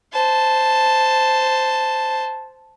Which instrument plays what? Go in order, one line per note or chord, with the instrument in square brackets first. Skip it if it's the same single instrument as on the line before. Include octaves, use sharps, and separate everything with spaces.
[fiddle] C5 A5